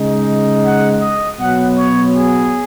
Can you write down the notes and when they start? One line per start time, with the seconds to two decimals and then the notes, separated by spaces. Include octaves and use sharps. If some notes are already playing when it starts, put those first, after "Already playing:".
Already playing: C#3 G#3 D#4
0.63 F#5
1.01 D#5
1.39 B2 F#3 B3 F#5
1.77 C#5
2.15 G#4